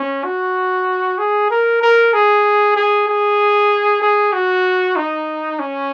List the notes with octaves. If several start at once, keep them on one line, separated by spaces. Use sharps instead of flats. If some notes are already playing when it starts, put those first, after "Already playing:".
Already playing: C#4
F#4
G#4
A#4
A#4
G#4
G#4
G#4
G#4
F#4
D#4
C#4